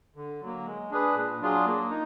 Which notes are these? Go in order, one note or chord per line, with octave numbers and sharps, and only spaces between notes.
D3
F#3 A#3
G#3
D4 G#4 B4
A#2
F#3 D4 F4 G#4
A#3
D#4